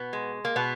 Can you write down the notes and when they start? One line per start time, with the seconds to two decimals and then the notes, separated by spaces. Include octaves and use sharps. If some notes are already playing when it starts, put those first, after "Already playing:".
Already playing: B2 B3
0.13 G#3
0.45 A#3
0.56 B2 B3